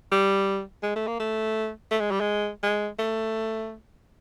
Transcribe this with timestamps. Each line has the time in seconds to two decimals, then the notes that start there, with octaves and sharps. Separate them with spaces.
0.12 G3
0.83 G#3
0.96 A3
1.07 A#3
1.20 A3
1.91 A3
2.00 G#3
2.11 G3
2.20 G#3
2.63 G#3
2.99 A3